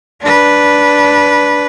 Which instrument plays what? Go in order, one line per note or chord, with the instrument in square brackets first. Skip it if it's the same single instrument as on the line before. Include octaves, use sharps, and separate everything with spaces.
[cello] D4 B4